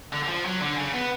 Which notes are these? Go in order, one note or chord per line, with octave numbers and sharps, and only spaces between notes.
D3
D3
F3
F#3
D3
C#3
B3